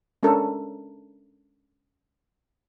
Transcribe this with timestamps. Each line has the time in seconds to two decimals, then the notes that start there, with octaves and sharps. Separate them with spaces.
0.23 G#3 C#4 D4 A4 A#4